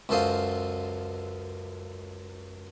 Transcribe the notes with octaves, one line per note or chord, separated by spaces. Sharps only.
C#2 F#2 A4 C5 D#5 F5